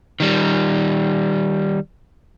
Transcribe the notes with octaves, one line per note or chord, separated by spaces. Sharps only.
D#3 G3